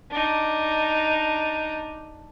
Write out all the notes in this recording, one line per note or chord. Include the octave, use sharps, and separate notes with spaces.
D4 D#4